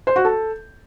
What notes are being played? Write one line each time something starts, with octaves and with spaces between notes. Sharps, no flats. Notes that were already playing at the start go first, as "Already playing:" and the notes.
C5
F#4
A4